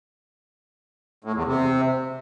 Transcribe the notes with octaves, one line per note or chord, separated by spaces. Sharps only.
A2
E2
C3